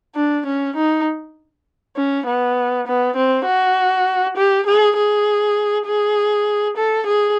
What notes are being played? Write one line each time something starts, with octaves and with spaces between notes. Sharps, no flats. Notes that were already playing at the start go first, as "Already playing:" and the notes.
D4
C#4
D#4
C#4
B3
B3
C4
F#4
G4
G#4
G#4
G#4
A4
G#4